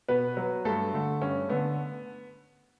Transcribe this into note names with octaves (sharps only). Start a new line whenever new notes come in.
B2 B3 B4
F#3 B3
G2 A3 A4
D3 A3
G2 C#4
D3 A3 B3